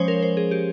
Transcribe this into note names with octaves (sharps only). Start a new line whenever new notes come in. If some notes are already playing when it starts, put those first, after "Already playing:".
Already playing: F3 G#3 C#4 C5 C#5
A#4
C5
G#4
G4